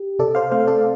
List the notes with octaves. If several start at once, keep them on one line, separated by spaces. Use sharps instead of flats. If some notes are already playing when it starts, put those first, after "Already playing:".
Already playing: G4
C3 A4 D5
C5 F5
A3 C4 C5 F5
A4 D5